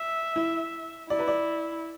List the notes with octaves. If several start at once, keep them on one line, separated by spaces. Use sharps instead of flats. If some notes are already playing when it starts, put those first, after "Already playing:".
Already playing: E5
E4
E4 D5
B4
D5